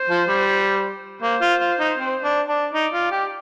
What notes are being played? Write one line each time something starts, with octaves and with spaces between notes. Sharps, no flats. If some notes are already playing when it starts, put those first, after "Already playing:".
Already playing: C5
F3
G3
A#3 C5
F4
F4
D#4
C4
D4
D4
D#4 D5
F4
G4